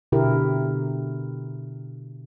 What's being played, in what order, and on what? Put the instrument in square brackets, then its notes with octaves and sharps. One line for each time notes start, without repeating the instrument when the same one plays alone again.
[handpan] B2 D3 E4 G4 A#4